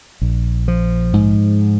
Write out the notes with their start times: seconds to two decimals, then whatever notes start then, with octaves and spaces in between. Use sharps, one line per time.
0.22 A#1
0.68 F3
1.13 G#2